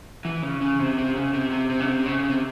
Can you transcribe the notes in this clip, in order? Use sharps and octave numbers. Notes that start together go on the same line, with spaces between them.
E3
C#3
C#3
C3
C3
C#3
C3
C3
C3
C#3
C3
C#3
C#3
C3